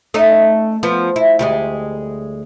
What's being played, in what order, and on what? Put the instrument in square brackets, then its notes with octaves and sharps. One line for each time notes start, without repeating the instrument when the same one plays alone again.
[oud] A3 C#4 D#4
F3 B3
E4
D2 G3 G#3